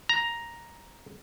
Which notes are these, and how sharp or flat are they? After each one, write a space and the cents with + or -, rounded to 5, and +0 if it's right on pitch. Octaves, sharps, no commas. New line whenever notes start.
A#5 +5